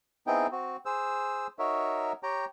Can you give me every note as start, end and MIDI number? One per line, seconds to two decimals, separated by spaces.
0.27 0.47 59
0.27 0.47 60
0.27 0.47 63
0.27 0.47 64
0.27 0.47 68
0.27 0.47 79
0.52 0.77 60
0.52 0.77 66
0.86 1.47 68
0.86 1.47 72
0.86 1.47 88
1.59 2.13 63
1.59 2.13 66
1.59 2.13 70
1.59 2.13 73
1.59 2.13 76
2.23 2.45 67
2.23 2.45 73
2.23 2.45 79
2.23 2.45 82